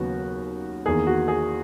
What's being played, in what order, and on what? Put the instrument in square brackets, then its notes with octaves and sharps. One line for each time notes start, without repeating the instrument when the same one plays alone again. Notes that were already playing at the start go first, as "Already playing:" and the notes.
Already playing: [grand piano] D#2 C#3 F#3 B3 F#4
E2 D#3 A#3 G#4
F#4
G#4